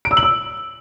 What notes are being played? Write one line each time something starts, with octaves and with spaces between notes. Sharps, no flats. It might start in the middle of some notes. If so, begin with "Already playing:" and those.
D7
E6
F#7
E6